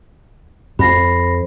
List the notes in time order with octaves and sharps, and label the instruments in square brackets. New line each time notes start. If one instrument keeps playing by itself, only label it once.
[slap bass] F2 [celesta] B5 A#6 C7